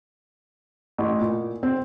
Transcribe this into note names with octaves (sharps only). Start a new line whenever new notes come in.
A1
A#2
C4